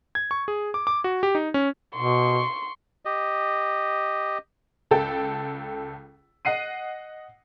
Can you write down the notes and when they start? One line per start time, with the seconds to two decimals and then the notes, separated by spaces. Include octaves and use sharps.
0.15 G#6
0.31 C#6
0.48 G#4
0.74 D6
0.87 D6
1.04 F#4
1.23 G4
1.35 D#4
1.54 C#4
1.96 B2 C6 C#6
3.05 G4 D#5
4.91 C#2 A4 G5
6.45 D#5 F#5 C7 D#7